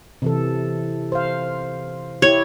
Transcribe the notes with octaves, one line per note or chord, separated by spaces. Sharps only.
C3 E3 A4
C5 F5
E4 G4 C#5